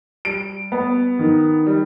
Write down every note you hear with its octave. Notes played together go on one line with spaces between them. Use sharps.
G3 D7
B3
D#3
G3